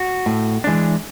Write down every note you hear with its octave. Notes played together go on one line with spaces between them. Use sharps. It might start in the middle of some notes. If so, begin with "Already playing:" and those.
Already playing: F#4
A2
E3 G#3 D4